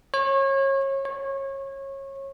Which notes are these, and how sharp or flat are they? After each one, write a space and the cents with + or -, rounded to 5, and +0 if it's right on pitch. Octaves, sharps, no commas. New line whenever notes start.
C#5 -30
C#5 -25